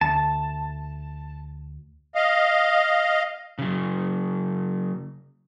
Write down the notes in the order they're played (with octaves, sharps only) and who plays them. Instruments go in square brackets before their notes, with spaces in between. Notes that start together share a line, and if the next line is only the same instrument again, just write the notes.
[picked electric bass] D2 [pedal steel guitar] A5
[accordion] D#5 F5
[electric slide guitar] C#3 F#3